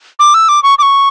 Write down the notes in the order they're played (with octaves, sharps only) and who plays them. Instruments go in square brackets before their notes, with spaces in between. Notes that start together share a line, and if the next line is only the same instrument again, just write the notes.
[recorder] D6
E6
D6
C#6
D6
C#6